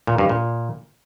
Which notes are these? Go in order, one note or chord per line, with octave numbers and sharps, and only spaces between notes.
A#2
G2
A#2